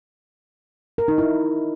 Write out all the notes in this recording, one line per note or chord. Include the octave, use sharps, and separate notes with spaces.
A#4
D#4
E4